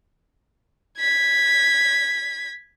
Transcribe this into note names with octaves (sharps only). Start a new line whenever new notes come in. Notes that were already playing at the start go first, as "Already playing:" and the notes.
G#6 B6